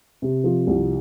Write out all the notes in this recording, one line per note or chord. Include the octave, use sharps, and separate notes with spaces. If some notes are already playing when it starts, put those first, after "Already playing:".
C3
F3
C2